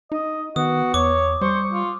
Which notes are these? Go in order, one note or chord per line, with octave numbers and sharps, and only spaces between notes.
D#4 D#5
D#3 B3 F#4 D#6
E2 C#5 D6
G3 C5 C#6
F4